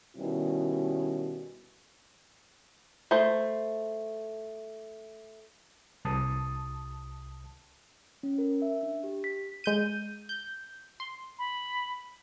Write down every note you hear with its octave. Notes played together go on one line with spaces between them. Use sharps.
B2 D#3 G3 C#4 E4
A3 C5
C2 A5 D#6
C#4
A#4
E5
D4
G4
B6
G#3 G6 D#7
G6
C6
B5